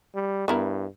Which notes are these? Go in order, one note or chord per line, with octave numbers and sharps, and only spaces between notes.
G3
G2 B3 E4 A#4